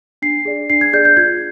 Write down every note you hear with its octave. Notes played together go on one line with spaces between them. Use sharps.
D4 C7
G#4 D5
D4 C7
G#6
G#4 D5 G6
G6
F4 G#6